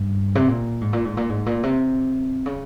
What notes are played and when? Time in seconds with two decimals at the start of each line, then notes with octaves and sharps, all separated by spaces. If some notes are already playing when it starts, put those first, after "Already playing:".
Already playing: G2
0.35 C3
0.48 A#2
0.81 G#2
0.93 A#2
1.05 G#2
1.17 A#2
1.29 G#2
1.46 A#2
1.63 C3
2.46 C#3